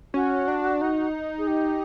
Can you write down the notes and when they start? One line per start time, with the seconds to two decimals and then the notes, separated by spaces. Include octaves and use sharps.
0.14 C#4 F#4
0.48 D4
0.81 D#4
1.38 G#4
1.47 G4